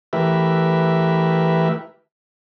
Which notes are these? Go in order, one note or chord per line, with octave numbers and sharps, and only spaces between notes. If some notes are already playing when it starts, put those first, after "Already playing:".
E3 A3 G4 A#4 B4 E5